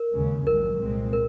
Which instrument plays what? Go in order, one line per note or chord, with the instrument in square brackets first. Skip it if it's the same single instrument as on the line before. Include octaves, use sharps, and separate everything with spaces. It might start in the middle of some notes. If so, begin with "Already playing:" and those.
Already playing: [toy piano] A#4
[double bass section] D#2 C#3 G#3 C#4
[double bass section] A#1 G#2 D#3 F#3 [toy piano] A#4
[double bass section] C2 A#2 G#3 C4
[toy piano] A#4